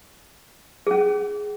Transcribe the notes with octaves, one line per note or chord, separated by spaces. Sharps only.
C#4 G#4